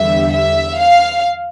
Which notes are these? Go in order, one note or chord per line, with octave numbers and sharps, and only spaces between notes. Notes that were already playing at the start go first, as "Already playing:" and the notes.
Already playing: E2 D3 G3 E5
E5
F5